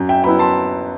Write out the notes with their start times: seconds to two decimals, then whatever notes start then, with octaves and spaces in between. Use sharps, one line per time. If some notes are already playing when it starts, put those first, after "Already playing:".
Already playing: F#2
0.09 E5 G5
0.24 F#3 B3 E4 G5 B5
0.39 A5 C6